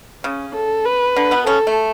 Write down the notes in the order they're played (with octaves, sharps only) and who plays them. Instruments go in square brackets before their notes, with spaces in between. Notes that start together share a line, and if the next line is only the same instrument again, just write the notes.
[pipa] C#3 [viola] C#4
[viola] A4
B4
[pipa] D3
B2 B3
[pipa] C#3 C#4 [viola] A4
[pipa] A3